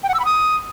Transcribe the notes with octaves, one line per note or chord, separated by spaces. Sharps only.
G5
F#5
E6
B5
D#6